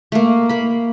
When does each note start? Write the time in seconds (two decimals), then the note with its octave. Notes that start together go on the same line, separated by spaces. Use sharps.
0.12 A3 A#3
0.49 A#3 B5